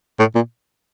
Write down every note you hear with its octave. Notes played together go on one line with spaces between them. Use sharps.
A2
A#2